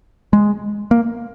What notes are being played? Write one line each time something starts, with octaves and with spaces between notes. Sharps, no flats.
G#3
A#3